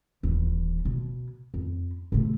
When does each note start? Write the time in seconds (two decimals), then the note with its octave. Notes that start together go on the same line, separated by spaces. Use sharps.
0.23 D#1 E3
0.85 B2
1.54 F2
2.12 C3 A3